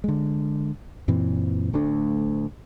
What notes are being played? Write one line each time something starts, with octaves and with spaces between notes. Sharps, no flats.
D3 G#3
F#2 A#2 E3 C4
D1 D2 A3 D4